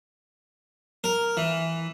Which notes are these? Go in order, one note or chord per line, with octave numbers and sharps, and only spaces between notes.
A#4
E3